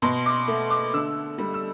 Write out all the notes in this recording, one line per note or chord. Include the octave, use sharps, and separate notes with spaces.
B2 C6
D6
A3
D6
D3 E6
G3
E6